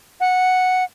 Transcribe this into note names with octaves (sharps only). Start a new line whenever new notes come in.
F#5